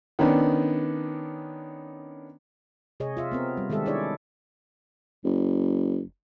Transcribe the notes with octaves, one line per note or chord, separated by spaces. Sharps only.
D#3 B3 C#4 D4
C3 G#4 C#5 D#5
F4 E5
B3 C4 A#4
G3
D#3 G#3 G4 A4 E5
D4 E4 G#4 C#5 D5
F#1